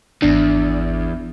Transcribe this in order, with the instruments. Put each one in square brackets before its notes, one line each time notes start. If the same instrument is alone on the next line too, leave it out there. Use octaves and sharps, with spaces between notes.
[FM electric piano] G#1 D4 [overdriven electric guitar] E2